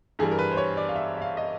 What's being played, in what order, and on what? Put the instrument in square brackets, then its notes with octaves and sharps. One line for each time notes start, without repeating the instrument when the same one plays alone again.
[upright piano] G2 E3 G3 G#4
A#4
B4
C5
C#5
D5
F5
E5
E5
F5
D#5